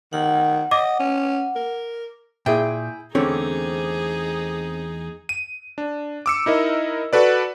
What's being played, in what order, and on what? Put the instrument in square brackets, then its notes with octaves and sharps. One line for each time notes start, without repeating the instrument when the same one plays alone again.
[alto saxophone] D#3 [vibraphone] F#5
[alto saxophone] D#5 [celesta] D6
[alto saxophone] C#4
A#4
[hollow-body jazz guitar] A#2 [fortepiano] E4 [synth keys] G#4 G5
[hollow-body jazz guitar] E2 A3 C#5 [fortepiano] D3 [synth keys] C4 [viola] D#4 G#4
[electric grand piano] D#7
D4
D6 E6 C#7
D#4 E4 A#4 D#5
F#4 A4 B4 D5